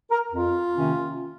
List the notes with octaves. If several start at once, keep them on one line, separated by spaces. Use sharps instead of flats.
A#4
F2 F4
C3 D#3 A#3 C#4